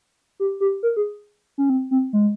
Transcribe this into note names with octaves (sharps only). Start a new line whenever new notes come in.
G4
G4
A#4
G#4
C#4
C4
C4
G#3